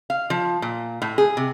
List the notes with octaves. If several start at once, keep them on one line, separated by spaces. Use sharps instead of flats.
F5
F3
A#2
A2
G#4
C3